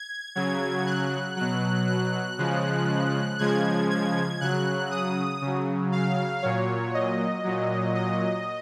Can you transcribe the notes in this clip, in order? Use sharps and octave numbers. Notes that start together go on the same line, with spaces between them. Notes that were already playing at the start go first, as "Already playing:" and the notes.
Already playing: G#6
C#3 F#3 G#6
F#6
B2 F#3 F#6
F#6
C#3 F3 G#3
C#3 F3 G#3 G#6
G#6
C#3 F#3 F#6
D#6
C#3 F#3
F5
A#2 F#3 C#5
D#5
A#2 F#3
D#5